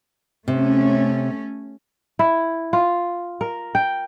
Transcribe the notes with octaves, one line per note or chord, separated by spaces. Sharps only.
C3 A3 C#4
E4
F4
A#4
G5